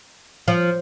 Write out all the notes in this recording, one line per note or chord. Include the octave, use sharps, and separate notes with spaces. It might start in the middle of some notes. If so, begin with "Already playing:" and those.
F3